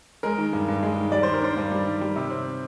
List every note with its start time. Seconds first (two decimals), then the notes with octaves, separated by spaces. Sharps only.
0.23 G#3 A#4
0.38 D#3
0.53 G2
0.68 G2
0.83 G#3
0.98 D#3
1.12 G3 D5
1.23 D#3 C5
1.34 A#4
1.42 D4 C5
1.56 G2
1.72 G3
1.86 D#3
2.01 G3
2.16 C3
2.30 C4